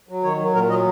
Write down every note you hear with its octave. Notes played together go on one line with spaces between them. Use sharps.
F#3
D#3 C#5
F#3
A#2 A#4
F#3 D#5